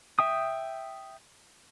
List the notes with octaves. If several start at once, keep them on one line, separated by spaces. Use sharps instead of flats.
E5 G5 D#6